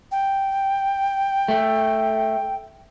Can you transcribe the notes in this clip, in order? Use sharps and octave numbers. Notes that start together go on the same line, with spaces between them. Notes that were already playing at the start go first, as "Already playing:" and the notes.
G5
A3